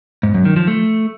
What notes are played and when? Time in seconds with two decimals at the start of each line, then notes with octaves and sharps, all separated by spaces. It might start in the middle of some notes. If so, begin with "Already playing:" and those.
0.23 G#2
0.34 F#2
0.45 D#3
0.56 F3
0.67 A3